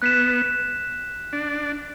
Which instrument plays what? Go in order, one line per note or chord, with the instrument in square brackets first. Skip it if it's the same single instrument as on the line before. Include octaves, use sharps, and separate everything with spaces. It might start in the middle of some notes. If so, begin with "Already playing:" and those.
[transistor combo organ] B3 [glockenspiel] F#6 B6 E7
[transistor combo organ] D4